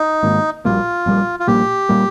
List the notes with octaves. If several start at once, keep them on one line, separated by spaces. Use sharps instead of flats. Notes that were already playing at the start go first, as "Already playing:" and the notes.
Already playing: D#4
G#2 D#3 A#3
A#1 A#2 G3 A#3 F4
A#1 A#2 G3 A#3
F4
A#1 A#2 G3 A#3 G4
A#2 G3 A#3